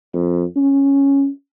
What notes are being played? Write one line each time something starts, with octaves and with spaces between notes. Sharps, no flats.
F2
C#4